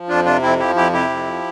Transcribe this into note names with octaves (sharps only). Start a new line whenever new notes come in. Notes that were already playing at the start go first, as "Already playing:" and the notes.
Already playing: F3
F2 D4 F4
C3 D4 F4
F2 C4 E4
F3 E4 G4
F2 E4 G4
C3 E4 G4
F2
F3